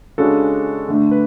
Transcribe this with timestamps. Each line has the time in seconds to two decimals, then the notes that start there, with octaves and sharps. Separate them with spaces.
0.18 C#3 G#3 D4 F#4 A4
0.88 D3 A3 D4
1.11 B4